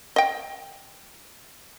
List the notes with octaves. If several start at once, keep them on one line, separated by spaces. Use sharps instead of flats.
D#5 G5